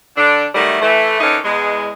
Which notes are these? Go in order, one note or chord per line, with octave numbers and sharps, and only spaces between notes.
D3 D4
D#3 F#3 G3 A3
E3 A3
D3 E3 A#3 C#4 D#4
E2 G#3